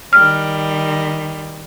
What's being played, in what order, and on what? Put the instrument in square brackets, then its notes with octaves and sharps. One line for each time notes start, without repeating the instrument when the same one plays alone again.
[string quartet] D#3 G3 [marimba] F6